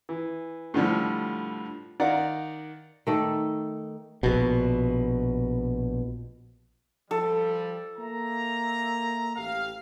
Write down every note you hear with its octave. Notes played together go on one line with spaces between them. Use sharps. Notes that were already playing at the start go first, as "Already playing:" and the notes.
E3
A2 D3 F3 G3
D#3 D5 F5 F#5 A#5
D#3 A3 D5
A#1 B2
F3 G3 A4
A#3 E5 A#5
A1 G4 F5